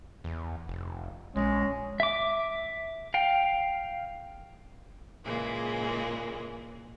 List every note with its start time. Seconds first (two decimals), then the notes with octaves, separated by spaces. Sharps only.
0.24 E2
0.68 F1
1.36 A#1 G#3 C#4
2.00 E5 D6
3.14 F5 G5
5.24 A#2 C#3 E3 G#3 A#3